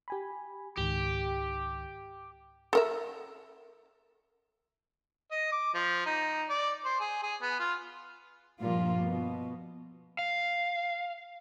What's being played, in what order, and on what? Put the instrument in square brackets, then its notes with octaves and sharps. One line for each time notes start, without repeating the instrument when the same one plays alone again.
[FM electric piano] G4 G#5 B5
[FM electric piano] C#2 G#2 D#3 [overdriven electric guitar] G4
[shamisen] A4 A#4 E5
[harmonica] D#5
D6
F3
D#4
D5
C5
G#4
G#4
B3
F4
[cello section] G2 A#2 F3 A#3 F4
B2
[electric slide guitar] F5